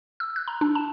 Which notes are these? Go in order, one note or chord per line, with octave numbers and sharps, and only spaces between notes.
E6
F#6
A#5
D4
A5